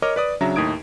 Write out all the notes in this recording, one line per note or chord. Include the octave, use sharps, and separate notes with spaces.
A#4 C#5 D#5 D6 F6
B4 D5 D#6
C#3 F#3 D4 E5 A#5
D#2 A2 D#4 D#6 G#6 D7